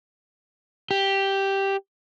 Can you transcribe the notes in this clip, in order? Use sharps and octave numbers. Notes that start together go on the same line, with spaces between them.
G4